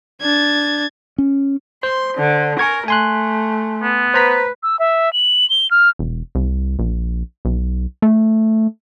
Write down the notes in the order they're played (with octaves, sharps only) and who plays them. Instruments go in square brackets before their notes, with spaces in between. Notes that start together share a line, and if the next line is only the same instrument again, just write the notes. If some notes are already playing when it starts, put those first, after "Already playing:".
[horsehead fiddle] D4 [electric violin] G#6 A6
[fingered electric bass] C#4
[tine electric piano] C5 [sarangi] C6
[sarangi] D3
[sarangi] A#4 [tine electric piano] G#5 C#6 G#6
[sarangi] A3 [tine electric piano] G#5 C6 F#6
[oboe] B3
[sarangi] B4 [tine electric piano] C5 A#5 B6
[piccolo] E6
E5
F#7
G7
F6
[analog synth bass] E1
C2
A#1
B1
A3